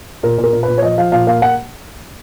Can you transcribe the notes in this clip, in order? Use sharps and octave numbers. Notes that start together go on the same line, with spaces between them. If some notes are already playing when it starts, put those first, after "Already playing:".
A#2 A#4
A#2
A#4
A#2
B4
A#2
C#5
F3 D#5
F3 F5
A#2 F5
A#3 F5
F#5